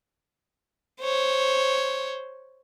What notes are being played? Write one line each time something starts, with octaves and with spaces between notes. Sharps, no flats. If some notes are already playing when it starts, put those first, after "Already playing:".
C5 C#5